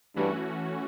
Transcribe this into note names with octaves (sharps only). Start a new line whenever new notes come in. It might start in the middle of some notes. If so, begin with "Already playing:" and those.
G2 E3 A3 C#4 F#4